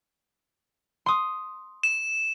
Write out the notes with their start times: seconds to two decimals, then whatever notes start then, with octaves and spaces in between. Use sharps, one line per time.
1.06 C6 D#6
1.83 E7